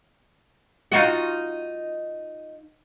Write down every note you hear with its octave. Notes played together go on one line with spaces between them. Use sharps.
D#4 F4 F#4